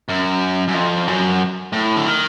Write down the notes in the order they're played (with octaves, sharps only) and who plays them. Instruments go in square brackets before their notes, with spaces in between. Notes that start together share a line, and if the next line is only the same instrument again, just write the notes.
[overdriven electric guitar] F#2
F#2
F2
F#2
A2
D3
D#3